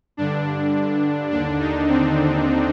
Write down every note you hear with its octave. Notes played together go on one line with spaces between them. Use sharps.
G2 D3 D4
D#2 D3 D4
D#4
C4